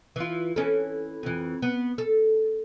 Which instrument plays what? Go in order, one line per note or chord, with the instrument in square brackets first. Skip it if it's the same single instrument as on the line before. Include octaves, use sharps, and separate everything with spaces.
[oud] E3 F4
E3 C#4 A4
F2 E3
B3
A4